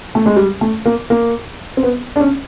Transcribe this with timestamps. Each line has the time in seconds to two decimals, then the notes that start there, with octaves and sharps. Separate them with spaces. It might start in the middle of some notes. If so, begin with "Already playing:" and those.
0.15 A3
0.26 G#3
0.36 G3
0.61 A3
0.85 A#3
1.10 A#3
1.77 C4
1.83 B3
2.16 D4
2.20 C#4